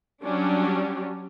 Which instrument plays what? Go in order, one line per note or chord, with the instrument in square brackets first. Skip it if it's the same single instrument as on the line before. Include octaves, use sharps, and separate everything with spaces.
[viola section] F#3 G3 C#4 D4